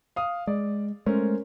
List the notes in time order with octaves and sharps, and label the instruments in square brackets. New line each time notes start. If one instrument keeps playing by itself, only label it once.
[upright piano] F5 D#6
[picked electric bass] G#3 [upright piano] D5
[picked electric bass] G#3 A3 [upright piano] C#4 A#4 C5